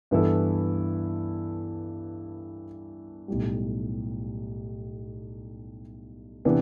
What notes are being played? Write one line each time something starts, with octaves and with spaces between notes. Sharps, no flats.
G2 E3 B3 E4 A4
B1 A2 G3
C3 E3 B3 D4